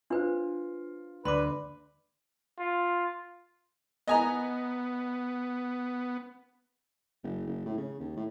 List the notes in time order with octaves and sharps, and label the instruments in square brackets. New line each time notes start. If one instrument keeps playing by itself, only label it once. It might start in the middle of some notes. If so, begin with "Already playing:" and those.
[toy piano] D4 B4 C5 [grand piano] F4
[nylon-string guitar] D2 [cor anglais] B4 [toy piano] C6 D6
[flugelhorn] F4
[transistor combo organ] B3 [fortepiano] D#5 G#5 A#5
[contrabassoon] F#1
F#1
A2
C#3
D#2
A2